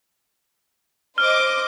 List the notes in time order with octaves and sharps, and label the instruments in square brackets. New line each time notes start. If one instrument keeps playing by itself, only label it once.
[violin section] C5 D#5 D6 [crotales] F6